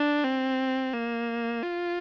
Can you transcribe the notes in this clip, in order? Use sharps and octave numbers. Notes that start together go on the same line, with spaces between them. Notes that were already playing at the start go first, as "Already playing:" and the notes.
Already playing: D4
C4
A#3
F4